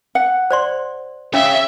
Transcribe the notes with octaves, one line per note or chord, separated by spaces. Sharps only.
F#5
C5 D5 C6
C#4 C#5 E5 F5